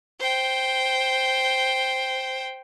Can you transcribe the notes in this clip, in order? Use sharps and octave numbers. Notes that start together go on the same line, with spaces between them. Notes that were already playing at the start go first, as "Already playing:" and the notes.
C5 G5